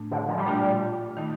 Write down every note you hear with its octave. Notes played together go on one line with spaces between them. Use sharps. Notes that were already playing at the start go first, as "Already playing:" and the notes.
Already playing: A2 A3 D4
D3
F3
G3
A#2 A3 D4 F4
D#3 A3 D#4